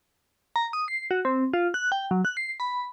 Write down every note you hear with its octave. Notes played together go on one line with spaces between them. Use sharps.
A#5
D#6
C7
F#4
C4
F4
F#6
G5
F#3
F#6
C7
B5